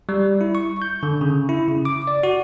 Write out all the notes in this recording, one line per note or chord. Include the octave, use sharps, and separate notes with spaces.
G3
E4
C#6
G6
D3
C#3
E4
C#3
D6
D5
F#4